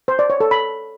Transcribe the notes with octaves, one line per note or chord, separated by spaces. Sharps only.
C5
D5
C#5
A4
B5